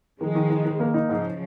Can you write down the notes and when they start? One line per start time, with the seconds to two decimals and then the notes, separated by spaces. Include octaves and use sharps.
0.20 D#3 F3 G#3
0.35 D#3
0.50 D#3
0.65 D#3
0.80 A#3
0.94 D#4
1.09 G#2 C#3 F3